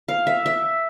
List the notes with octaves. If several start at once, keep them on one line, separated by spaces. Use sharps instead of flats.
F5
E5
E5